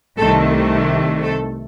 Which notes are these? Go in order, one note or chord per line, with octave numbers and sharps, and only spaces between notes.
C2 C3 D#3 A3 A4
A4